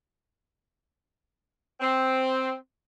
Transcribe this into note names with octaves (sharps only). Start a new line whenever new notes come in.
C4